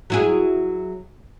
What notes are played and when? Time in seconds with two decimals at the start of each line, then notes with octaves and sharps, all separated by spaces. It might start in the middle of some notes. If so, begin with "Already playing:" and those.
0.10 F#3 E4 G#4